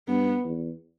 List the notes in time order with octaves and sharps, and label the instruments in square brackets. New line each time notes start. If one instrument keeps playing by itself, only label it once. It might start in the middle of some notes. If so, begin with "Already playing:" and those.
[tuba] G2 [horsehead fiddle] B3
[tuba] E2